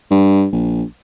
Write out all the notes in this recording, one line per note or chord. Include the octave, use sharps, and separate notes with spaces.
G2
A#1